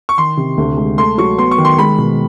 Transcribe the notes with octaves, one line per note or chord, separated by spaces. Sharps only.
C#6
D#3 C6
C3
D2
G#3
A3 C6
F#3 C#6
B3 C6
C#6
D#3
C6
G#3 B5
B2